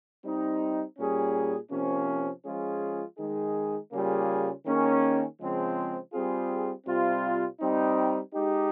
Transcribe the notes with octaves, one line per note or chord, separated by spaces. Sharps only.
G3 C4 D#4
A#2 G3 C#4 G#4
C3 F3 A#3 C#4
F3 G#3 C#4 F4 G#4
D#3 G#3 D#4 G#4
C#3 G3 A#3 F4 G#4
D#3 A#3 C#4 G#4
C#3 F3 G#3 C4
G3 C4 F4 G#4
C3 G3 C4 F4
G3 C4 D#4
G#3 D#4 G4